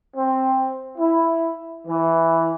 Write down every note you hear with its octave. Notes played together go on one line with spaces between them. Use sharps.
C4
E4
E3